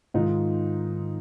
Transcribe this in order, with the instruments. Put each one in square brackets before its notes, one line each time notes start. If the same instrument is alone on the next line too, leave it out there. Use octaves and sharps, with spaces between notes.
[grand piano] G#2 D#3 D#4 F4